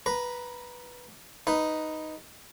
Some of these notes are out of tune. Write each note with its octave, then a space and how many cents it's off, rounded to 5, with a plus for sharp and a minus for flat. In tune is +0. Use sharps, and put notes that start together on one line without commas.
B4 -5 A#5 +10
D#4 +0 B4 +0